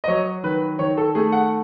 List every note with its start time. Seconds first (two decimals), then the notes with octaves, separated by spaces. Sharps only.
0.04 D#5
0.08 F#3 C#5
0.44 D#3 B4
0.79 D#3 C#5
0.97 A4
1.15 A3 G#4
1.32 F#5